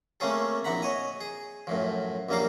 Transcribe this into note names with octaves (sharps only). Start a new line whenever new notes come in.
A3 A#3 C4 C#4 G#4 A4
A#1 C4 E4 F#5 A#5 B5
C#5 D#5 G#5
G#4
F#2 A2 F3
A#1 F#2 G3 A#3 A#4 F5